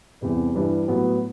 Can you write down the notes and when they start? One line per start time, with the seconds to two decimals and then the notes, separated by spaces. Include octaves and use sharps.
0.21 E2 C3 E3 G3
0.55 G2 E3 G3 D4
0.88 A2 F#3 B3